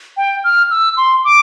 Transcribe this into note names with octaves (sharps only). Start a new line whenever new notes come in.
G5
F6
E6
C6
D6